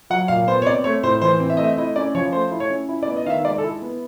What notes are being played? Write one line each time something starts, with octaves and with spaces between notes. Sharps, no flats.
F#3 F#5
A#2 F5
B3 C5
C#5
C4 D5
A3 C#5
A2 C5
E3 C5
C4
E5
A3 D#5
E5
E4 D#5
C#4 D5
F3 C#5
A3 C5
E4
C#5
C#4
E4
D5
B3
D#5
D#3 E5 F5
G#3 D5
A4
E4
B3